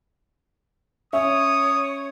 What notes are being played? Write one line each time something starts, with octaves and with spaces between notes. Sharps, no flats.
C#4 C#5 E5 D#6